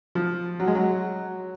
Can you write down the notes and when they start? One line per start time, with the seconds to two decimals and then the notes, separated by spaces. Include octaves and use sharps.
0.15 F3
0.60 F#3
0.67 G#3
0.75 F#3